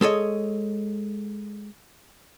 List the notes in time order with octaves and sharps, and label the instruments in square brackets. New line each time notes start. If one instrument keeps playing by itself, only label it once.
[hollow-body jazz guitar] G#3 A4 C#5 D#5